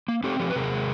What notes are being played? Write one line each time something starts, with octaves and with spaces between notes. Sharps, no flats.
A#3
C4 G4 A4
F3 G4 A4
B4
C3 G#4 A#4
G#3